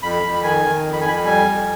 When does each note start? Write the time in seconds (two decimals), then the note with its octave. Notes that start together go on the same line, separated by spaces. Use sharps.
0.02 F2 B5
0.23 F2
0.35 B5
0.43 D#3 G#5
0.64 D#3
0.84 F2
0.93 B5
1.01 G#5
1.04 F2 B5
1.24 G3 G#5
1.45 F2